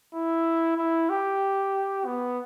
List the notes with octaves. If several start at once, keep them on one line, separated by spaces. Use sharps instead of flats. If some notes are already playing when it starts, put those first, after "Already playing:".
E4
E4
G4
B3